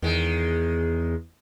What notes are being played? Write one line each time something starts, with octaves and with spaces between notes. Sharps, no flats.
E2 D#3 G#3